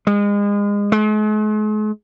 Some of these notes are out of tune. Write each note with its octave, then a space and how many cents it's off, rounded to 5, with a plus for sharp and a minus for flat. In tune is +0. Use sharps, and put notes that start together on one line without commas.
G#3 -30
G#3 +45